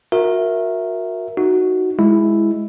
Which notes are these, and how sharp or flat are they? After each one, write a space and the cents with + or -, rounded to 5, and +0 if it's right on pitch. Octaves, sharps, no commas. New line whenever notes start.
F#4 -30 A#4 +0 E5 +0
D#4 +0 F#4 +0
G#3 +0 E4 +0